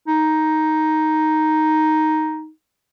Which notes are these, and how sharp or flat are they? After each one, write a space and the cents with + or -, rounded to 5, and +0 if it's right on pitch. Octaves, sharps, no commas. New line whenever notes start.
D#4 +5